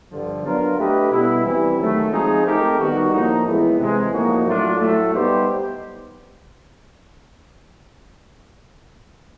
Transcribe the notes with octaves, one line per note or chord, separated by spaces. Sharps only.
G2 D3 F3
F#3 B3 D4 F4 A#4
A3 D4 G4 B4 D#5
B2 G3 B3 E4
E3 G3 C4 E4
D#3 F#3 A3
F3 G#3 C4 D#4 G#4
A3 C4 D#4 G4 A#4
D#3 G3 B3 D#4 F#4
A2 F3 A#3 D#4
A2 E3 G#3 B3
C3 E3 G#3
A2 F3 A#3 D#4 F#4
A2 F#3 A3 D4 F4
A2 F#3 A3
G3 B3 D#4 G4 C5